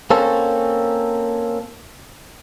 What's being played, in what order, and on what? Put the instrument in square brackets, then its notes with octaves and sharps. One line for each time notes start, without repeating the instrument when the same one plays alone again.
[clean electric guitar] A#3 C4 C#4 A4